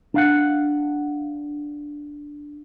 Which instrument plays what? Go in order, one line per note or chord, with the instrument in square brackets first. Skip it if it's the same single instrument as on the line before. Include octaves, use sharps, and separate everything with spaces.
[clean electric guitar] D4 F5 F#5